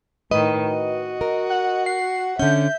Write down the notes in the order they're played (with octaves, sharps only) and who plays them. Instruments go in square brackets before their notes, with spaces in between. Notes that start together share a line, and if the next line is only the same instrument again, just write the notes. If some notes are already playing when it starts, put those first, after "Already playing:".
[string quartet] A2 D#3 [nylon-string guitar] B4 [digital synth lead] D#5
[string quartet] F#4
[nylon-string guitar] A#4
[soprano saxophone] F#5
[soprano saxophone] F#5 [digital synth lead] C7
[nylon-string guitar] D3 C#4 [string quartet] E5 [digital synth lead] G6